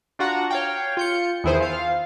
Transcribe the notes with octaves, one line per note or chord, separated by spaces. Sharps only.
D4 F4 F#4 F#5 A#5
C#5 F5 G5
F4 G6 C#7
E2 D#3 E4 G#4 C5
F4 F5